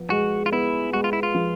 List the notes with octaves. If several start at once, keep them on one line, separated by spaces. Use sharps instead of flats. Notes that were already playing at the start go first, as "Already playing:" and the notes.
Already playing: F3 B3
G#3 F#4
F4
B3 E4
G#3 F#4
F4
E4
F4
F3